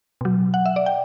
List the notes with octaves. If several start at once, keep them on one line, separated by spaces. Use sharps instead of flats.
B2 F#3
F#5
E5
D5
G5